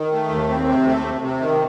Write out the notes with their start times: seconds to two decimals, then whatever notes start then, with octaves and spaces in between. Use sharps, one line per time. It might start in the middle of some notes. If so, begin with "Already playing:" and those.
Already playing: D#3
0.12 A3
0.30 D#2
0.49 C4
0.67 C3
0.86 A3
1.04 C3
1.21 C3
1.41 D#3